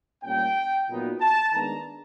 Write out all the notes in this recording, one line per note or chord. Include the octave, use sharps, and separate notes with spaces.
A#2 G3 A#3 C#4 G5
A#2 F#3 B3 D#4
A5
D#3 G#3 B3 D4 A#5